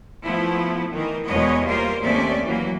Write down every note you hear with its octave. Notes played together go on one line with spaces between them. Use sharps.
F3 A3 B3 E4
D#3 E3 A#4
E2 B2 G#3 B3 C#5 D#5
G3 A#3 F4 A#4 C5
D#2 A3 C4 C#4 D5 E5
E3 F#3 A#3